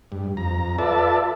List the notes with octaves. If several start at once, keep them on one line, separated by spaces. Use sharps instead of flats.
G2
F2 A#5
F4 A4 B4 D5 E5 A5